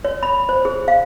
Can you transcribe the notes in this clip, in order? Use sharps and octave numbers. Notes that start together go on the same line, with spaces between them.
C#5
B5
C5
G#4
F5